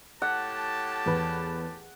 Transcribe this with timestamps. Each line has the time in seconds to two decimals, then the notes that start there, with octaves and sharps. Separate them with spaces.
0.22 A2 G4 F#5 A5
1.06 E2 B4